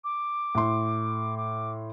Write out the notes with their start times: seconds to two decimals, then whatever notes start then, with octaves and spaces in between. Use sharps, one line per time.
0.04 D6
0.55 A2 C6
1.37 D6